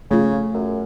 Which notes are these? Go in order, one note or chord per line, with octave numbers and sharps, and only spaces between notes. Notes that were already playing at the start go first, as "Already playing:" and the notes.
C#3 A3 F4
F#2